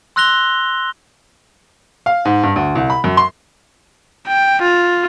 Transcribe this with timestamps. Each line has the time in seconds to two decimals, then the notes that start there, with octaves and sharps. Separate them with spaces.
0.16 C6 E6 F#6 A#6 F7 G7
2.06 F5
2.25 G#2
2.43 G2
2.56 D2
2.75 C2
2.90 B5
3.04 F#2
3.17 C6
4.28 G5
4.62 F4